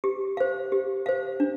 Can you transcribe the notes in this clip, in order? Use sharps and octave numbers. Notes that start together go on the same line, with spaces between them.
G4
C5 F5
G4
C5 F5
D4